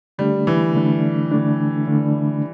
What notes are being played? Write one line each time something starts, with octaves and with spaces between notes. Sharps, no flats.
D3 G3 A3 D4
E3
D3 A3 D4
D3 A3 D4
D3 A3 D4